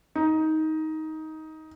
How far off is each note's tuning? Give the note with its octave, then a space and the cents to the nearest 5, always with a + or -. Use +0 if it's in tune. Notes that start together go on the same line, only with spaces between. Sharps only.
D#4 +15